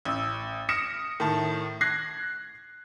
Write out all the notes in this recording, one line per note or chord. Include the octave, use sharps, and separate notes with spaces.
A1 E6
D#6 F6 A#6 C#7 D7 E7
A2 D#3 A5
F#6 G#6 A#6 C7